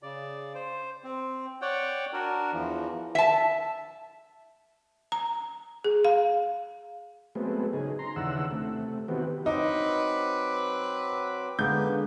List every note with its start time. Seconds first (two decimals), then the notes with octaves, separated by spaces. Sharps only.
0.02 C#3 D5
0.55 C5
1.04 C4
1.62 C#5 D5 F#5 G5
2.13 D4 F#4 A#4
2.53 E2 E3 F3
3.15 E5 A5
5.12 A#5
5.84 G#4
6.05 F5
7.35 F#3 G#3 A3 B3 C4
7.73 C#3 D#4 G#4
7.99 A#5 C6
8.16 D#2 C#3 E3 D4 F#5 E6
8.51 C3 A3
9.08 D#3 E3 B3 C4 F#4 G4
9.46 F#3 C4 D#4 B4 D6
11.59 D3 G#3 A#3 B3 B4 G6